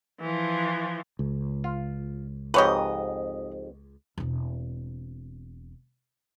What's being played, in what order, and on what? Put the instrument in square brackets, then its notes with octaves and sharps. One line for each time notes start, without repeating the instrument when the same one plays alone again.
[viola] E3 F3
[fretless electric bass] C#2
[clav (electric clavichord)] F4
[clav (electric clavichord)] F2 G#2 G4 [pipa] B4 C#5 D#5
[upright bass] E1 C4